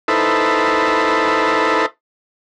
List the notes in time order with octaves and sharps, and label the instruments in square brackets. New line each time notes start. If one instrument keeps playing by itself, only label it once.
[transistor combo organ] D#4 E4 A4 B4 C5